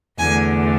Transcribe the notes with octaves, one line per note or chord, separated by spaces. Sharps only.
E2 D3 A3 G#5